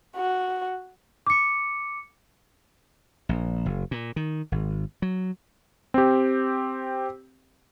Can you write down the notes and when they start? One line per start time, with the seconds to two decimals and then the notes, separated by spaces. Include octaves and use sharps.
0.16 F#4
1.27 D6 C#7
3.29 A#1
3.66 F#1
3.91 A#2
4.16 D#3
4.52 G#1
5.02 F#3
5.94 C4 G4